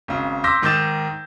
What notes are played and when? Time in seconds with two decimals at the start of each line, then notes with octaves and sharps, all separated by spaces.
0.08 G#1 C#3
0.44 C6 D6 E6 G6 A#6 B6
0.62 G#2 D#3 D6 G6 A6 E7